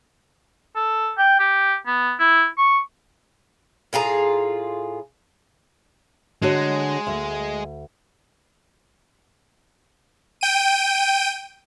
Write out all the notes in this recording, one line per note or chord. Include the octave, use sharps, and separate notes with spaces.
A4
G5
G4
B3
E4
C#6
A2 F4 G#4 A#5
D3 G#3 F#4 C#5
D2
G5 D#7